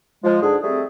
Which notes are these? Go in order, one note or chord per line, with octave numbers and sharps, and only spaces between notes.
F3 G#3
G#2 D3 D4 G#4
G3 A3 C4 G#4